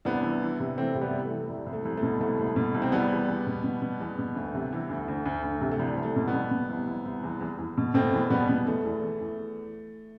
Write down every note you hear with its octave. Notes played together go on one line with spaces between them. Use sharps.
C2 B3 D4
E3
E3
C3
E3 A3 C4
C3
G3 B3
C3
A3
E3
C2 G3
C2
A3
C2
A3
B2
C2 A3
C2
B2
C2
C4
E2 G3 B3
E2
E2
B2
B2
B2
E2
B2
D2
C3
E3
D2
D2
D2
D2
C3
A3
C2 G3
C2
A3
B2
G3 B3
B2
B2
C2
C2
C2
E2
E2
E2
B2
B2 A3 C4
E2
B2 G3 B3
B2
E2 A3
E2
E3
E2